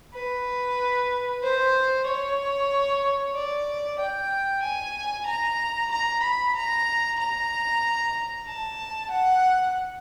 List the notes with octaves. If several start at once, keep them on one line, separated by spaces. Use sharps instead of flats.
B4
C5
C#5
D5
G5
G#5
A#5
A#5
B5
A#5
A#5
A5
F#5